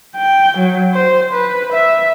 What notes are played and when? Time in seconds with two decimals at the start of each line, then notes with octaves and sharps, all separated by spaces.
0.16 G5
0.58 F#3
0.94 C5
1.33 B4
1.72 E5